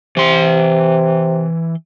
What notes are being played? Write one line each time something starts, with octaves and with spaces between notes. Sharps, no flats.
C3 E3 C6